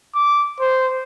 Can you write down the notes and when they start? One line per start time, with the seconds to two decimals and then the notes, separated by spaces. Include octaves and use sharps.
0.15 D6
0.61 C5